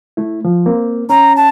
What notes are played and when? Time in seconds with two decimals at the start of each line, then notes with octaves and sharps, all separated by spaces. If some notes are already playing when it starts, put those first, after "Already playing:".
0.17 A3 E4
0.45 F3
0.66 A#3 C4
1.10 C#4 A#5
1.36 A5